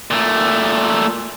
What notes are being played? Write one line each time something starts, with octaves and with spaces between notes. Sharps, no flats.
A#2 A3